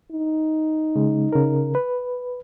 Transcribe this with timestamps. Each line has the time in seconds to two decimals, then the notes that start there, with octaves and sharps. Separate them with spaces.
0.11 D#4
0.96 C#3 G#3
1.33 C#3 A#4
1.75 B4